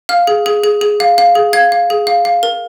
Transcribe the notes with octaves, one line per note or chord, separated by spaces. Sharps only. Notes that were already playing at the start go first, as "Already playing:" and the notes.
F5 F6
G#4
G#4
G#4
G#4
F5
F5
G#4
F5 G#6
F5
G#4
F5
F5
A#4